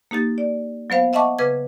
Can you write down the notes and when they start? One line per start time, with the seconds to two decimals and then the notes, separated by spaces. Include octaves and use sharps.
0.11 A#3 D#4 G4 A6
0.38 D5
0.90 F#3 B3 C5 F5
1.13 D#5 E5 F#5 A5 C#6 D6
1.39 C#3 B4 D6 G#6